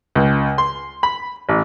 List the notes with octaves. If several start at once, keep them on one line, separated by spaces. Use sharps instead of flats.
C#2
C6
B5
A1